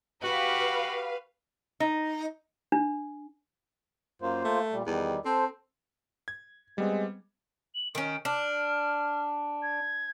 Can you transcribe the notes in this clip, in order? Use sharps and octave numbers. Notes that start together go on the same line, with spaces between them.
F#4 G4 B4 F5
D#4
D4
F#2 A#3 F4 C5
A3
A#2 G3
E2 D#3 G3
C4 A4 C5
G#6
G3 G#3 B3 C4
F#7
D#3 C#4 D7
D4 F6
G#6